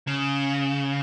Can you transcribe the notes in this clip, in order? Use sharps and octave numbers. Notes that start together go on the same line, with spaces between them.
C#3